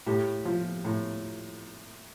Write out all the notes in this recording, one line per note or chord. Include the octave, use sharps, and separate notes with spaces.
A2 G4
F3
A2